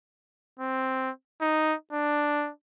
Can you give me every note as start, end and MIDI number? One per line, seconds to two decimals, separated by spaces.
0.60 1.10 60
1.41 1.74 63
1.93 2.50 62